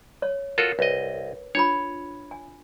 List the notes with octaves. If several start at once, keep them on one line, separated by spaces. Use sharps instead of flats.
C#5
F4 F#4 A4 A#4
C2 B4 C#5 D#5
D4 F4 C#5 B5
G#5